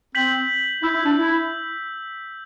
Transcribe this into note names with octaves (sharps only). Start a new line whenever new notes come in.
C4 G6 B6 F#7
E4 E6 G6 B6
E4
D4
E4